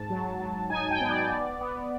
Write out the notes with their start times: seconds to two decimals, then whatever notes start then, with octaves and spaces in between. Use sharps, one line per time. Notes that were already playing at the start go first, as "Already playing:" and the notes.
Already playing: G#2 A5
0.10 F#3
0.39 F#3
0.70 D#4 G#5
0.91 G5
1.01 B3
1.10 D5
1.30 B3
1.61 B3